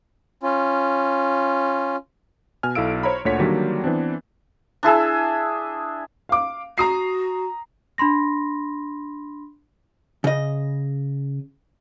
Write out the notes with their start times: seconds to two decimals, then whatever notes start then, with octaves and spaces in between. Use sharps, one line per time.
0.43 C#4 F4
2.63 B2 G#5 F6
2.75 B1 E4 A4 F5 E6 D7
3.03 C5 C#5 A#5 B5
3.25 D2 A#2 D3 C#5 F#5 B6
3.39 D3 D#3 F#3 G3 A#3 D4
3.84 E3 B3 C4 D4
4.83 D4 E4 G#4 E6
6.29 F5 D6
6.78 F#4 A#5 D#6 C7
7.98 D4 B5 C6 A#6
10.24 C#3 D#5